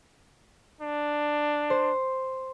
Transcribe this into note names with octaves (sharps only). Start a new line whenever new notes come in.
D4
C5